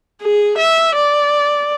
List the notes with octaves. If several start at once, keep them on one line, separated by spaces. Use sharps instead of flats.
G#4
E5
D5